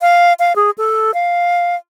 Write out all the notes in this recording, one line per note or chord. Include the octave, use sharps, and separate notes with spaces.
F5
F5
G#4
A4
F5